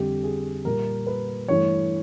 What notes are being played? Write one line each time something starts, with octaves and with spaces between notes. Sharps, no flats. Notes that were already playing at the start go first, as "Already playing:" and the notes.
Already playing: F2 D3 G3 G4
G#4
A#2 G3 A#4
B4
G2 E3 A3 C#5